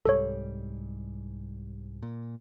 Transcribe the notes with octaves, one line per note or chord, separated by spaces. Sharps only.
C2 G#2 G3 A4 C#5
A#2